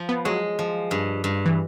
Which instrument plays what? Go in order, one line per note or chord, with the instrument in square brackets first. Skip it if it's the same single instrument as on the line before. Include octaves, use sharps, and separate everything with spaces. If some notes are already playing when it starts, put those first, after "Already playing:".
Already playing: [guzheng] F3
[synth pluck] B3
[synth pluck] F#3 [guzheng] G#3
[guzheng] F3
G2
G2
[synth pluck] E3